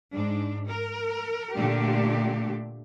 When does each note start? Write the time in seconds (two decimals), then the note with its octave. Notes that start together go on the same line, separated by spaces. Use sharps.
0.14 G#2 D4
0.70 A#4
1.57 A#2 D3 A3 D4 G4